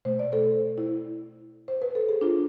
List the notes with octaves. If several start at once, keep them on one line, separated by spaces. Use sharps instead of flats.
B2 A3 C5
D5
A4 C5
E4
C5
B4
A4
G#4
D4 F4